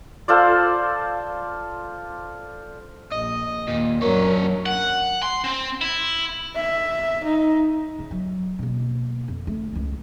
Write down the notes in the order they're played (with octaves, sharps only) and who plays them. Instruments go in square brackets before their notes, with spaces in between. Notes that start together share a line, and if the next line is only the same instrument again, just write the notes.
[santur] F4 A4 C5 D5
[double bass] A#1 [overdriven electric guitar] D#5
[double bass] D#2 [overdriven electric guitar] A#2
[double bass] F#2 F#3 [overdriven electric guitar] D4 C#5 [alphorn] A#4
[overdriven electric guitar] F#5
C6
C4
E4
[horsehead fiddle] E5
D#4
[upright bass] C#3
F#3
B2 A#3
F2
A3
C#2 C#4